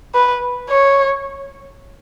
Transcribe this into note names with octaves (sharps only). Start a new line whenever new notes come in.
B4
C#5